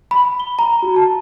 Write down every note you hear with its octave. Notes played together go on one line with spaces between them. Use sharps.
B5
G7
A#5
F#4
A5